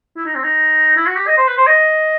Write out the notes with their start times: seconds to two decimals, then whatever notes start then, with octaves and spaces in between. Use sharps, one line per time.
0.17 E4
0.26 D#4
0.35 C4
0.44 D#4
0.97 E4
1.07 F#4
1.17 G4
1.27 D#5
1.37 C5
1.47 B4
1.57 C5
1.67 D#5